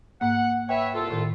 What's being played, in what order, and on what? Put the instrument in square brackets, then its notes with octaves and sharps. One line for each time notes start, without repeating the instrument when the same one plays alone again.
[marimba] G#2 A#3 [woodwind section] F#5
[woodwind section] B4 C#5 E5 [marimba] G5
[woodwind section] C2 F4 A4
[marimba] A2 D#3